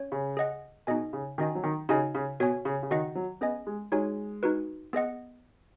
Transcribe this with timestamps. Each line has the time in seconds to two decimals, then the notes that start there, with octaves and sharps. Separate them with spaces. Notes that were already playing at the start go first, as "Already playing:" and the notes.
Already playing: C#4 C#5
0.12 C#3
0.37 G#4 D#5 F#5
0.87 B2 D#4 G#4 D#5 G#5
1.13 C#3
1.38 D#3 C#4 F#4 D#5 G#5
1.55 F#3
1.64 D#3
1.89 C#3 D#4 F#4 D#5 G#5
2.15 C#3
2.40 B2 F#4 C#5 G#5
2.65 C#3
2.83 C#3
2.91 D#3 F#4 D#5 F#5
3.15 F#3
3.41 B3 C#4 G#4 D#5 G#5
3.67 G#3
3.92 G#3 D#4 F#4 C#5 G#5
4.43 D#4 F#4 B4
4.93 B3 G#4 D#5 F#5